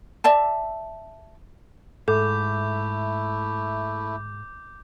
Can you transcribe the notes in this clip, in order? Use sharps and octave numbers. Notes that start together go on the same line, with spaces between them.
D5 E5 A5
G#2 A3 E4 A4 D6 G6